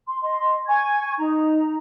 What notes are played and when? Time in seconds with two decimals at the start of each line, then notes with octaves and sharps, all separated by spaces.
0.07 C6
0.22 D#5 C6
0.67 G#5 C#6 G#6
1.18 D#4 A#5